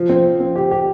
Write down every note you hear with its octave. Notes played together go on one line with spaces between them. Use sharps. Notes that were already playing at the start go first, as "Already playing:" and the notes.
Already playing: F3
C4
F3
C4
G4
G4